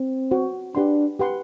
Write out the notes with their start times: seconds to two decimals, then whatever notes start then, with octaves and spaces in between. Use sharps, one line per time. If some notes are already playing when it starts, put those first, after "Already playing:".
Already playing: C4
0.31 F#4 C5 F#5
0.75 D4 G4 B4 F#5 C6
1.19 G4 B4 F#5 C6